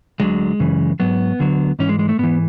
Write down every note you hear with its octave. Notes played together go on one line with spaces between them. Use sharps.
D2 D3 F#3 G#3
F#2 C#3 E3
G#2 F#3 B3
D2 D3 F#3
G#2 E3 C#4
G#3
G#3
A3
G#2 E3 B3